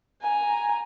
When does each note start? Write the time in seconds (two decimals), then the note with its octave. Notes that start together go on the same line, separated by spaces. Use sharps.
0.22 G#5 A#5